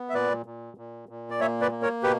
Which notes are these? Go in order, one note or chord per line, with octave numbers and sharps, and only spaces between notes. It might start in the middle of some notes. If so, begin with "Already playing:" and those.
Already playing: B3
E5
A#2 B4 D5
A#2
A#2
A#2
D5
A#3 C#5 E5
B4 D5
A#3
A#4 C#5
B2 G4 B4